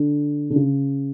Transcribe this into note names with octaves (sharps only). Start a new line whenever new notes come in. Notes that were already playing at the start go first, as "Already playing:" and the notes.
Already playing: D3
D3
C#3